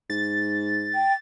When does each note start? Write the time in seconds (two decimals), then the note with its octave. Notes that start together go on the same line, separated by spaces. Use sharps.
0.10 G#2 A6
0.95 G5